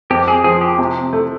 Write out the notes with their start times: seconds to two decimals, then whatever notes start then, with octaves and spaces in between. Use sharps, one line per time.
0.10 F2 G4
0.28 G#4
0.44 F3 G#4
0.61 G4
0.78 C3
1.13 A3